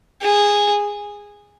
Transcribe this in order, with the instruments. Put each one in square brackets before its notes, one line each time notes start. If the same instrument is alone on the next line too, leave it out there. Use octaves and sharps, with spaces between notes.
[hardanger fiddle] G#4